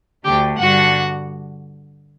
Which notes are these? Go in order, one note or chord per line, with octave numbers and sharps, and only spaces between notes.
D2 D3 A3 G4 G5
G2 D3 G3 F#4 F#5